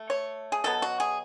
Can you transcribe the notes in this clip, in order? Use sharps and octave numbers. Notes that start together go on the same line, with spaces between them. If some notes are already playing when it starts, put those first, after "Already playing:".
Already playing: A3
C#5
G#4
B2 F#3 B3 A4
F#4
G#4